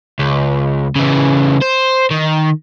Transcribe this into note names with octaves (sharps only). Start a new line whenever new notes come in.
C#2
C#3 E3
C5
D#3